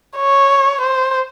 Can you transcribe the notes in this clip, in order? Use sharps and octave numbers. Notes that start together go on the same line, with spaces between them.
C#5
C5